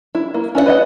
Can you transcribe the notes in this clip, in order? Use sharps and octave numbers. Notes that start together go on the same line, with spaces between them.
E4
A#3
C#4 E4 D5 F#5
B4 D#5 F#5